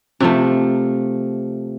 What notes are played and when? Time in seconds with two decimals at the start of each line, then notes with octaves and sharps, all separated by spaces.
0.20 C3 F3 A3